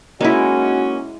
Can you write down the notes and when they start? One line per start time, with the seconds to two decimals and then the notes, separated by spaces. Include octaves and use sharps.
0.21 G#3 A#3 C#4 D#4 E4 F#4 G#5